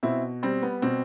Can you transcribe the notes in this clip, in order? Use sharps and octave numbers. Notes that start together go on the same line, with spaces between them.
B2 C4 E4
G3 C4
B3
B2 C4